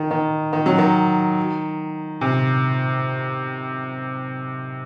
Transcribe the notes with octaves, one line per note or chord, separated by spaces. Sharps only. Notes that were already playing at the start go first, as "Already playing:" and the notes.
Already playing: D#3
D#3
D#3
F#3
D#3
C3